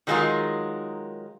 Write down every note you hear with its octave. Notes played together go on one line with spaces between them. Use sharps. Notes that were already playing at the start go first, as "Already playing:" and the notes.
D#3 F#3 G#3 E4 F4 A#4